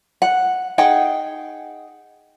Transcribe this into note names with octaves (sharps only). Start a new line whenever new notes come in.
F#5
D#4 G#4 F#5 G5